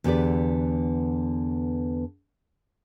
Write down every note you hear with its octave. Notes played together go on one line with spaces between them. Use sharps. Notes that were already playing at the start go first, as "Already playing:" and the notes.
E2 D3 B3 G4 B4 D5